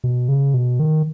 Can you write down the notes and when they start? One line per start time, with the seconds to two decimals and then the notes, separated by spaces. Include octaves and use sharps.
0.04 B2
0.29 C#3
0.54 B2
0.80 D#3